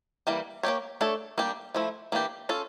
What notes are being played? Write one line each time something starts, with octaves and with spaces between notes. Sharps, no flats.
E3 G3 A#3
A#3 C#4 G4 C#5
A3 D4 A4 C#5
G3 A#3 D4 G4
F3 A3 E4
E3 A#3 D4 G4
C#4 F4 A4